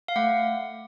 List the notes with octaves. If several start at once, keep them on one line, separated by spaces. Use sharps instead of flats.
F5
A3 F#5